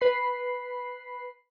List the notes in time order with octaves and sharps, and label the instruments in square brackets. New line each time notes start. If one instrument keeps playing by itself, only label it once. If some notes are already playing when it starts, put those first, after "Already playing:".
[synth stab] B4 B5 C7